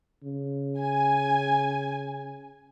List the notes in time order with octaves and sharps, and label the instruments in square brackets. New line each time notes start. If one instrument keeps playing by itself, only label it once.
[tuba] C#3
[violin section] G#5